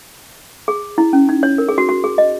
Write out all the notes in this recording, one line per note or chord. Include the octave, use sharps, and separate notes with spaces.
G#4
E4
C#4
D#4
C#5
A#4
G#4
F#4
F#4
G#4
D#5